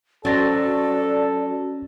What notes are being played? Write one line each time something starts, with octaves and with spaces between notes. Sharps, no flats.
F#3 C4 C#4 A4 D5 A6 A#6